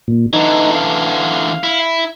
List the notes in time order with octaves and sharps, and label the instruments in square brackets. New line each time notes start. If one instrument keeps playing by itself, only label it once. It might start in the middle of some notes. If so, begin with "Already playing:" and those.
[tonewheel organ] A#2
[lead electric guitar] D3 E3 [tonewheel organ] D#4
[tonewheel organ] F5
[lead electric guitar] E4